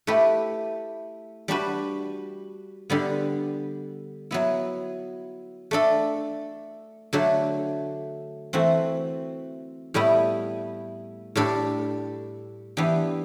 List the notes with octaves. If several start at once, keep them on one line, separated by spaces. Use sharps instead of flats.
A3 E4 G4 B4
G3 D4 F#4 B4
D3 G3 B3
F#3 B3 E4
A3 D4 A4
D3 F#3 A3
E3 A3 C4 F#4
A2 G3 B3 E4
A2 G3 D4 A4
E3 B3 D4 G4